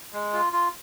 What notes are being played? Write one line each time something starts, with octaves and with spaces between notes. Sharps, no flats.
G#3
F4
F4